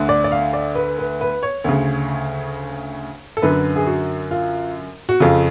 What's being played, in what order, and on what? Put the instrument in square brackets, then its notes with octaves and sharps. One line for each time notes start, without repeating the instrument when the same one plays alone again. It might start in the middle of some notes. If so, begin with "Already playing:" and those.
Already playing: [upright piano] D2 D3
D5
D5
F5
D5
B4
B4
B4
C#5
D2 C#3
A4
F#2 D3 B4
G#4
F#4
F4
F#4
F2 C#3 F4